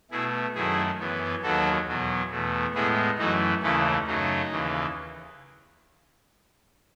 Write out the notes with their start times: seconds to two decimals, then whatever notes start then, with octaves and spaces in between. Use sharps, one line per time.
0.11 B2 A3 E4 G#4
0.55 F#2 D#3 A3 E4 G#4
0.99 F#2 E3 B3
1.43 D#2 D#3 F#3 F#4 A4
1.87 E2 B2 F#3
2.31 E2 B2 A3
2.75 A2 G#3 B3 E4 G#4
3.18 F#2 E3 A3 D#4 F#4
3.62 D#2 C#3 E3 A3 C#4 E4
4.07 F#2 C#3 F#3 A3 D#4
4.51 D#2 C#3 E3